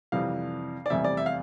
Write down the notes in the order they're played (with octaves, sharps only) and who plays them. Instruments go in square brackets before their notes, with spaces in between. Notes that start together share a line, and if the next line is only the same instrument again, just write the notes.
[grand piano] F2 C3 E3 G3 F5
D5
F1 E2 C3 G3 E5
D5
E5
F5